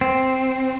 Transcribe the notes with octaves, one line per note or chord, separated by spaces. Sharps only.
C4